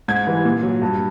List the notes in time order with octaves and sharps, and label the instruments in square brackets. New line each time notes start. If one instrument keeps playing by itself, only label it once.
[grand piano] G#2 G#6
E3 G3
A#2
F#3
G2